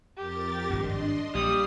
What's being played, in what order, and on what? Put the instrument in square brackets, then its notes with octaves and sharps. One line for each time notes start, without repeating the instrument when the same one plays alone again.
[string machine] F2 A#4 A6 [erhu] G4
[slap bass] G#1 G2 [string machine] D4 D#5 C6
[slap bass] A#1 [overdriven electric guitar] G3 [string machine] F5 C7 [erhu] D#6